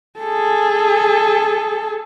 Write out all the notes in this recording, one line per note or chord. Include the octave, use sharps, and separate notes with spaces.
G#4 A4